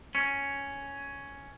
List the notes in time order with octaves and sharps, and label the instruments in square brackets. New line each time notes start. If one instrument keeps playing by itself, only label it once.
[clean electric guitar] C#4